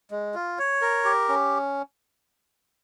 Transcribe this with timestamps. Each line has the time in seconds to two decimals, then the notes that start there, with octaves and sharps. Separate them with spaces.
0.11 G#3
0.34 F4
0.59 C#5
0.81 A#4
1.05 G4
1.29 C#4